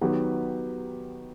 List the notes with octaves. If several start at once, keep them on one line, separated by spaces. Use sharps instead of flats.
D#3 F#3 B3 D#4 G4